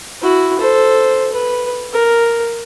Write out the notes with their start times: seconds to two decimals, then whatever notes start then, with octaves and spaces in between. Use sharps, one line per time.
0.21 E4 F#4
0.59 A4 C5
1.32 B4
1.93 A#4